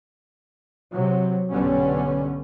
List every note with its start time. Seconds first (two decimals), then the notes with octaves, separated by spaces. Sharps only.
0.93 C3 F#3
1.50 B1 G2 D3 G3 B3 C#4